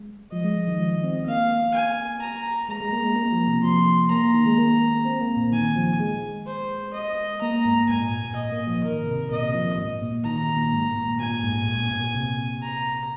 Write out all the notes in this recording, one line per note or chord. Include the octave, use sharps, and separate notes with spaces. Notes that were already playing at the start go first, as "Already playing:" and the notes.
Already playing: G#3
F3 D#5
G#3
F3
D#3
F3
C4
A#3 F5
G#5
A#5
G#3 A#5
G#3
A#3
G#3
A#3
F3
C3
F3 C6
A#3 A#5
D#3
G#3
A#3
C4
A#3
A#2
D#3 G#5
F3
G#3
C5
D#5
A#3 A#5
G#2
G#2 G#5
A#2
A#2
D#5
A#3
F3
D#3 A#4
C3
A#2 D#5
C3
F3
C3
G#2
A#2
D#3 A#5
A#2
G#2
A#2
A#2 G#5
G#2
A#2
A#2
C3
A#5